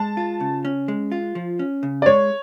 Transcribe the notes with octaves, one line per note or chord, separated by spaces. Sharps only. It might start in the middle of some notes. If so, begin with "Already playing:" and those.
Already playing: G#3 A5
F4
C#3
C#4
G#3
F4
F3
C#4
C#3
D5
G#3 C#5